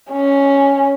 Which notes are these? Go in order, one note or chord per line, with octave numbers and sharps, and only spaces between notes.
C#4